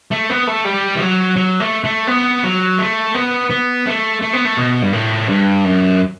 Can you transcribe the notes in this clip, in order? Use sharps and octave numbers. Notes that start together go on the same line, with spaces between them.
A3
B3
A3
G3
E3
F#3
F#3
A3
A3
B3
F#3
A3
B3
B3
A3
A3
B3
A3
B2
G2
A2
G2
F#2